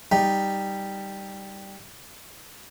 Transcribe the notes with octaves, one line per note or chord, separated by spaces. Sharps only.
G3 D#4